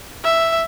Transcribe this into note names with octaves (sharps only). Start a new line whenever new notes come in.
E5